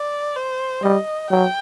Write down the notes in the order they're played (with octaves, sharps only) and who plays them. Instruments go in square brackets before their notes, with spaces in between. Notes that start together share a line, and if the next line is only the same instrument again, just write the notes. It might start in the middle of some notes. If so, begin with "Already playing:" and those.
Already playing: [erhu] D5
C5
[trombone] G3 [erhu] D#5
[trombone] F#3 [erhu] G5